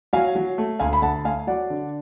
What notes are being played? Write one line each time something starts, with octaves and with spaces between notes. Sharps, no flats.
F#3 F5 G#5
F#3
A3
D2 F5 G#5
B5
D2 F#5 A5
A3 F5 G#5
F#3 D5 F#5
D3